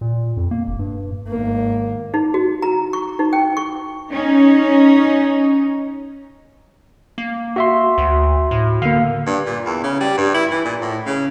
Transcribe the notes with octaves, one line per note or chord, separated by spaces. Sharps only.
A#2
F2
A#3
F1
G2
G#1 A#3
D#4
F#4
A#5
C#6
D#4
G5
C#6
C#4 D#4
A#3
F#4 E5 C6
D2
A2
D3 A#3 F5
G2
A#2
E2
C#3
G3
G2
E4
E3
A#2
A2
C#3